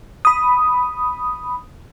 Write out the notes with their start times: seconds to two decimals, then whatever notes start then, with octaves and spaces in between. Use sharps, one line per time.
0.25 B5 D#6